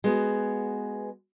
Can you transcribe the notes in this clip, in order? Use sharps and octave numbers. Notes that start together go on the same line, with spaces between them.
G#3 B3 F#4 B4